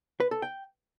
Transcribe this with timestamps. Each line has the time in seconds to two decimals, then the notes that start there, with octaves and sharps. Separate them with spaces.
0.20 B4
0.31 A4
0.42 G5